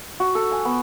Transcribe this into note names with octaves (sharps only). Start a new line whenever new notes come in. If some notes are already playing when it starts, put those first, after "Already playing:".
F#4
A4
G#5
B3